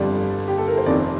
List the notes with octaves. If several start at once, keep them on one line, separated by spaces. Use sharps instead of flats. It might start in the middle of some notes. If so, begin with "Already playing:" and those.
Already playing: G1 F2 D3 G3 D5
G4
A4
A#4
C5
F1 F2 C3 D#3 D5